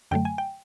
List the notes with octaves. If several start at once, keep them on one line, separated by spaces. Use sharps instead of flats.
F#2 D3 F#3 A3 G5
G#5
G5